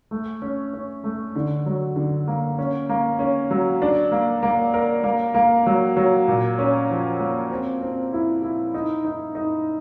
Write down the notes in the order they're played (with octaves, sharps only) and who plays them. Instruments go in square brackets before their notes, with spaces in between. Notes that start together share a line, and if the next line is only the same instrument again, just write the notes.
[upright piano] A3
C#4
C#4
A3
D3
F#3
D3
A#3
C#4
A#3
C#4
F#3
D4
A#3
A#3
A#4
A#3
A#3
F#3
F#3
A#2
C#4
F3
A#3
C4
C4
E4
E4
D#4
D#4
D#4